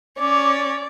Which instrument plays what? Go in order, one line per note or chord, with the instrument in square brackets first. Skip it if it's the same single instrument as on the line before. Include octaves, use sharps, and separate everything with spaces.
[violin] C#4 C#5 [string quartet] D5 [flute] D6